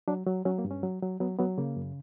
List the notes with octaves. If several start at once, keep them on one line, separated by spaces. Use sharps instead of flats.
F#3 D4
F#3
F#3 C#4
A#3
G2
C#4
F#3
F#3
F#3 B3
F#3 B3
C#3 A#3
F#2